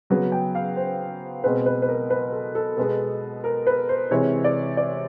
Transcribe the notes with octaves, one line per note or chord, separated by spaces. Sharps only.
C#3 F#3 B3
G5
F5
C5
B2 G#3 C4 B4
B4
B4
A#4
B4
A4
A4
B2 G#3 B3 A4
A#4
B4
C5
C3 E3 G#3 C#5
D5
D5